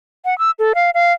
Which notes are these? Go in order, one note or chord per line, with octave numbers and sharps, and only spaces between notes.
F#5
E6
A4
F5
F5